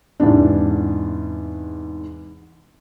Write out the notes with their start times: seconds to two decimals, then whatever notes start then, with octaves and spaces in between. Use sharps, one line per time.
0.20 E2 G#2 C3 D4